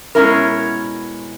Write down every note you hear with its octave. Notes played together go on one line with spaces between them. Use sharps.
B2 G#3 C#4 E4 A#4